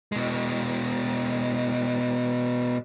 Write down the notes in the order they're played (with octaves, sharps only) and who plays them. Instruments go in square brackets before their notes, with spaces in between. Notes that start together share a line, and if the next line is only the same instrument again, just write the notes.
[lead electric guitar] B2 G#3